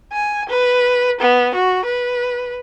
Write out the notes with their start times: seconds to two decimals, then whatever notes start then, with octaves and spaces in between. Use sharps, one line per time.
0.13 G#5
0.49 B4
1.20 B3
1.55 F#4
1.85 B4